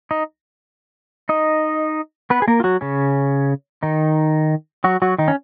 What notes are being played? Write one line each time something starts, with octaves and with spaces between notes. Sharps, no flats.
D#4 D#5
D#4 D#5
B3 B4
G#4
A#3 A#4
F4
F#3 F#4
C#3 C#4
D#3 D#4
F#3 F#4
F#3 F#4
D#3 D#4
C#4